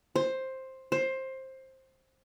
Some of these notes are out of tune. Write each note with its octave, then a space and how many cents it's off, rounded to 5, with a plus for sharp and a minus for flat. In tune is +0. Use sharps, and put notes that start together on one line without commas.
C5 +10
C5 +15